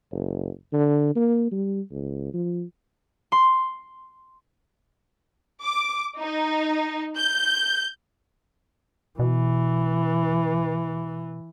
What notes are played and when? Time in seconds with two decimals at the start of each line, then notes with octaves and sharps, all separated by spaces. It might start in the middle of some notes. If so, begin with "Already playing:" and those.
0.11 F#1
0.73 D3
1.15 A#3
1.51 G3
1.92 C#2
2.34 F3
3.32 C6
5.63 D6
6.19 D#4
7.18 G6
9.19 B2 E3